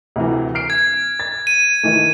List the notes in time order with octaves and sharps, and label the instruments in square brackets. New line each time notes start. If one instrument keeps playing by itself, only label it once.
[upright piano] D2 C3 E3
F6 C7 D7
[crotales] G#6
[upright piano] A6
[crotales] D#7
[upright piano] D#3 E3 A3